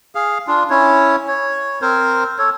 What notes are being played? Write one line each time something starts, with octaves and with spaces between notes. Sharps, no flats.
G#4 F5
D4 F4
C#4 E4 C#5
C#5
C4 A#4 C5
A4 C#5